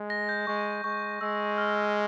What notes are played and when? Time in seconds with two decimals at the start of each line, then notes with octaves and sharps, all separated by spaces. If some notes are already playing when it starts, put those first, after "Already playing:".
Already playing: G#3
0.10 A#6
0.29 G6
0.47 G#3 C#6
0.84 G#3 C#6
1.21 G#3 E6
1.58 F6